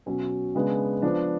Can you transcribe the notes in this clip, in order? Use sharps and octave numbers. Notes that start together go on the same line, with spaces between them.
B2 F#3 C#4
C#3 G#3 B3 D4
F3 B3 D4